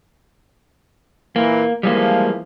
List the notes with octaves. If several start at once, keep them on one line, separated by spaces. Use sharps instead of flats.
A#2 E3 A#3
E3 F3 G3 G#3 A#3